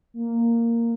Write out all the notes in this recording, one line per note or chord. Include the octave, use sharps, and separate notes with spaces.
A#3